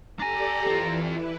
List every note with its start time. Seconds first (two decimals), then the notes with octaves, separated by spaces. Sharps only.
0.20 D4 G4 A4 D5 G#5 A#5
0.67 E3 C4 F4
1.05 E4 B4